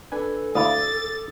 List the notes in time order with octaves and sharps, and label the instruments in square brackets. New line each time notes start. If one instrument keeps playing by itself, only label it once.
[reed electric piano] D4 B4 G#5 [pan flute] A4
[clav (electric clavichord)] D2 E4 F5 [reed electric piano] D6 D#6 [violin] A6